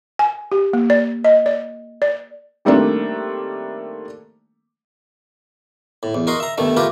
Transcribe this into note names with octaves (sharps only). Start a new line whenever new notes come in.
G#5
G4
A#3
D5
D#5
D5
D5
D#3 G3 A3 A#3 C4 D4
A2
E2
F#4 A#4 D#5 C6
E5 A#5
G2 B2 D#3 A3
A3 F4 G4 A#4 B4